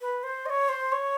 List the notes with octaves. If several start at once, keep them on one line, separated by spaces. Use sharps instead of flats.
B4
C5
D#5
C#5
C5
C#5